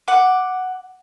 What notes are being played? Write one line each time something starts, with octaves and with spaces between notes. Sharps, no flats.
F#5 D6